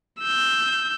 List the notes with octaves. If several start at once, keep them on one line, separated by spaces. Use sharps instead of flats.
E6 G6